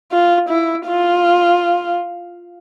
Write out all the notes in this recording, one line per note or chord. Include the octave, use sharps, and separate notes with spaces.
F4
E4
F4